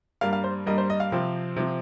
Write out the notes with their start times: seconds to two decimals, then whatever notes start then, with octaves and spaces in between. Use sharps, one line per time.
0.21 G2 G3 A#3 F5
0.33 F5
0.44 C5
0.66 G2 G3 A#3 D#5
0.78 C5
0.90 D#5
1.00 F5
1.12 C3 F3 C4
1.56 C3 F3 C4